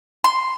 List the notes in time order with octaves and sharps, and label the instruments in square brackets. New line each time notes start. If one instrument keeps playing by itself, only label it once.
[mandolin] C6